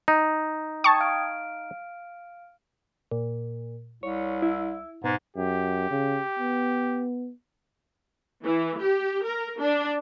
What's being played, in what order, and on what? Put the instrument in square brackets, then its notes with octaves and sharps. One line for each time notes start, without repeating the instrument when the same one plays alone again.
[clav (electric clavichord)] D#4
[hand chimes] G5 D#6 G#6 [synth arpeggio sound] A5 C#6
[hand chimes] F5 F6 D7
[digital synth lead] A#2
[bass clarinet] C2 [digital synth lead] C#5
[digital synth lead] E4
[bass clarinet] G#2 [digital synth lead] B2
[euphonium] F#2 [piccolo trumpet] G4
[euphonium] C#3
B3
[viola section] E3
G4
A#4
D4